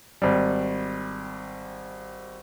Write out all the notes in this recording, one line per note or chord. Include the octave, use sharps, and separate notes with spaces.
G#1 G3